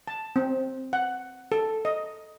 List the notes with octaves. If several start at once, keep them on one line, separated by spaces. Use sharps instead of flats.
A5
C4
F#5
A4
D#5